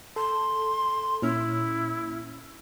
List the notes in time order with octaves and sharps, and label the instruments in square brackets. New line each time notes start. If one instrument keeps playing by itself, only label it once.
[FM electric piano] A4 [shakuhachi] C6
[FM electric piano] A#2 C#4 F6 [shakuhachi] E4